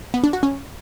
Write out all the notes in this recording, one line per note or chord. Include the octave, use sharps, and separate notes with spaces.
B3
D4
F#4
C#4